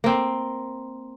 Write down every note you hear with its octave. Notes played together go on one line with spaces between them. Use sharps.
A#3 C4